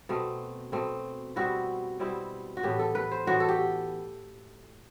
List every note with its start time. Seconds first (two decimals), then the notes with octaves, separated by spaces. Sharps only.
0.09 B2 A3 C4
0.72 B2 A3 C4
1.36 B2 G3 C4 E4 F#4
1.99 B2 G3 C4 E4
2.57 F#4
2.63 A2 E3 B3 G4
2.79 A4
2.95 B4
3.11 C5
3.27 A2 E3 B3 F#4
3.40 A4
3.49 G4